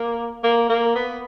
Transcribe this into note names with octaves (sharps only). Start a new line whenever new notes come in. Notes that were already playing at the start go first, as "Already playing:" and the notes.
Already playing: A#3
A#3
A#3
B3